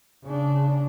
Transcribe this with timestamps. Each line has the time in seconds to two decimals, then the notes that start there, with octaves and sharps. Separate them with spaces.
0.23 C#3 D4